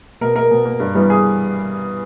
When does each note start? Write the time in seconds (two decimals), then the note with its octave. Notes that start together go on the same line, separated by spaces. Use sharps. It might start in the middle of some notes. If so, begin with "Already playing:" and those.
0.21 B2 A#4
0.35 A#3 A#4
0.51 B2
0.65 A#3
0.80 G2
0.95 E3 G3 B3
1.10 G#4